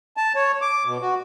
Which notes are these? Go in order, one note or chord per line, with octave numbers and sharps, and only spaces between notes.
A5
C#5
D6
B2
F#4